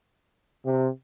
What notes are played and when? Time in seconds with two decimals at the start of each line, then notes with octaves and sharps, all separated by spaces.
0.66 C3